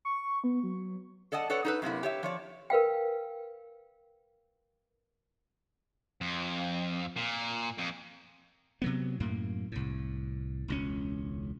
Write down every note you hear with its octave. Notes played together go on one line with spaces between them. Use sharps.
C#6
B3
F#3
A4 D5 D#5 F#5 A5
A4 B4 C#5 D5 F#5
D#4 A4 B4
F#2 C3 A#3 E4
G4 C#5 E5
F3 C#5 D5
A#4 B4 F5 G5
F2
A#2
F2
C3 F#3 B3
F#2 A2 A#3
C2 A2
E1 C#2 C#4